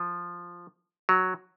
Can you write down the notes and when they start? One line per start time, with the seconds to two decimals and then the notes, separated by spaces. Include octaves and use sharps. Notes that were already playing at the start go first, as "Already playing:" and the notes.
Already playing: F3
1.09 F#3